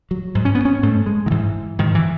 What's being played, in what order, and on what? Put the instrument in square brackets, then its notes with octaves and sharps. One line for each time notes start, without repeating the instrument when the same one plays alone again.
[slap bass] F#3
G#2
C#4
B3
C#4
G#2 A3
G#3
D#3
G#2 E3
G#2 D#3
E3